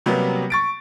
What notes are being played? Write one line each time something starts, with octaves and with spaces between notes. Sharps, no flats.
C3 F#3 G3 A#3 B3
C#6 A6 D7